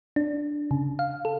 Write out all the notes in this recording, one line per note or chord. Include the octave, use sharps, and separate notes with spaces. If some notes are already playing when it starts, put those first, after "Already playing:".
D4
C#3
F5
A4